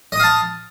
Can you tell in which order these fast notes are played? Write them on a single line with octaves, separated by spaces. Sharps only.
D#5 D#6 F5 A5